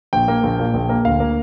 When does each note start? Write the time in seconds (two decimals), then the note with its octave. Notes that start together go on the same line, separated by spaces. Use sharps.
0.13 A#1 G5
0.28 A#3
0.44 A#1
0.59 A#2
0.74 A#1
0.89 A#3
1.05 D2 F5
1.20 A#3